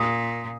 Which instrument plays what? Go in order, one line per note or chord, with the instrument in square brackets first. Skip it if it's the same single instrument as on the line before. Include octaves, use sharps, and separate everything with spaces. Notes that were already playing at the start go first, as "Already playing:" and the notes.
Already playing: [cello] A#2 [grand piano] D#6